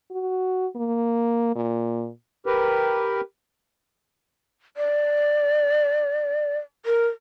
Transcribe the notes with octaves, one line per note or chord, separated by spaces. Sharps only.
F#4
A#3
A#2
G4 A#4 B4
D5
A#4